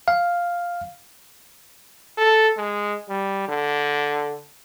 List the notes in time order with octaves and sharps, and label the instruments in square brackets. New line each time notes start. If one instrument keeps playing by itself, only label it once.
[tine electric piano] F5
[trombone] A4
G#3
G3
D3